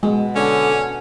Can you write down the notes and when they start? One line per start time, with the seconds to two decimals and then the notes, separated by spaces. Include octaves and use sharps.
0.03 B2 G#3
0.36 D3 C#4